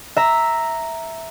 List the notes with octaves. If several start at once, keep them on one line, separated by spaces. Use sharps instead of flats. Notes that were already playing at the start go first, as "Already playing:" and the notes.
E5 A#5